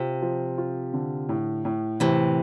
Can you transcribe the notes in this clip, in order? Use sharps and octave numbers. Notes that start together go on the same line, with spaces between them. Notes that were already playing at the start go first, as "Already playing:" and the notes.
Already playing: C3 F4
F3
F4
D3
A2
A2
A2 C3 E3